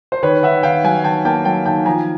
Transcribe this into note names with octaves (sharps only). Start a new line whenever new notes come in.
C5
D#3 B4 C#5
D#3 E5 F#5
D#3 F5 G5
F#3 F#5 G#5
D#3 G5 A5
A#3 G5 A5
F#3 G5 A5
D#3 G5 A5
F3 G#5 A#5